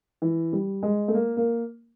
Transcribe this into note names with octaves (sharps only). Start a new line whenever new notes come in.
E3
G3
G#3
A3
A#3
A#3